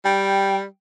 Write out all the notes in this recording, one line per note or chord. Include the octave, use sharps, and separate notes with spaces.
G3 G5